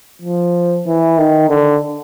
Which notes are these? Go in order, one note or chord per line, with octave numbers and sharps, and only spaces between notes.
F3
E3
D#3
D3